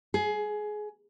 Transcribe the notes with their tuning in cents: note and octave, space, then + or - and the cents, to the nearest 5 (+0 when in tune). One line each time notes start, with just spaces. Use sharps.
G#4 +20